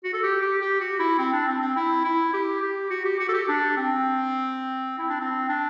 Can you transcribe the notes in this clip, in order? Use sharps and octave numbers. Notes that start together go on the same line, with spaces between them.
F#4
A4
G4
G4
G4
F#4
E4
C4
D4
C4
C4
E4
E4
G4
G4
F#4
G4
F#4
A4
G4
D4
C4
E4
D4
C4
D4